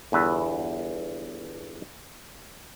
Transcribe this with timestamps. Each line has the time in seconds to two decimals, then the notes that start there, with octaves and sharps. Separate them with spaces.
0.12 G1 E2 B4 E5